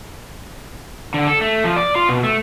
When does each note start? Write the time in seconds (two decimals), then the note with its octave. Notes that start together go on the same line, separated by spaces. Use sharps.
1.14 D3
1.27 A4
1.41 A3
1.64 F3
1.76 D5
1.95 F4
2.09 B2
2.23 A3